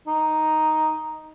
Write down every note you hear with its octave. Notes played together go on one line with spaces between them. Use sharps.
D#4